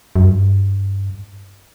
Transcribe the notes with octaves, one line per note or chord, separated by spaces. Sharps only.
F#2
G2